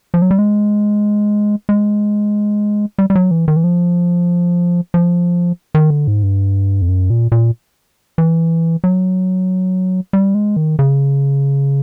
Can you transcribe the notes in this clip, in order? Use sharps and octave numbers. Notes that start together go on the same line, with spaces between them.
F3
F#3
G3
G#3
G#3
G3
G3
F#3
E3
D#3
E3
F3
F3
D#3
D3
G#2
G2
F2
F#2
A#2
A#2
E3
F#3
G3
G#3
D#3
C#3